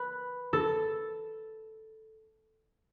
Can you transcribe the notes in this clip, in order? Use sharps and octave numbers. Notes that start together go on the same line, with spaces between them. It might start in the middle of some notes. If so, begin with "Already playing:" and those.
Already playing: B4
A4